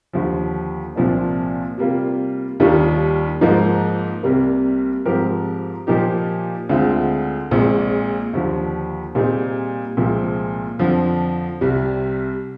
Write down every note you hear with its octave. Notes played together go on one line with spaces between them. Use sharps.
D#2 D3 F3
C2 A#2 F3 A#3 D4
C3 G3 A#3 F4
D#2 D#3 G3 D4 F4
G#2 F3 A#3 D#4
C2 C3 G3 A#3
G#2 F3 C4 G4 A#4
A#2 F3 A#3 D#4 G4
D2 D3 G#3 C4 F4
A#1 A#2 G#3 C4
D#2 D3 F3
A#2 G3 C4 D#4 G#4
C2 A#2 F3 G#3 C4
F2 D3 F3
C2 C3 G3